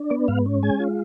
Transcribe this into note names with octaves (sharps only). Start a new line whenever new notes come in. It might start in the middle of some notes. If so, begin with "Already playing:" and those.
Already playing: D4
B3 D5
G#2 F5
C#4
G#3 G#5
F4